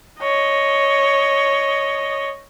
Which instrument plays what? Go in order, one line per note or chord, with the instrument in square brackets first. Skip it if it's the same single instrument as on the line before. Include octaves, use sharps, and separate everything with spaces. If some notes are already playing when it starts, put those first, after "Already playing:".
[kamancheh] C#5 D#5